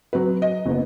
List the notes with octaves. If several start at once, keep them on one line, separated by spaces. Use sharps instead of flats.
F#3 C4 B4
D#5
F#1 B3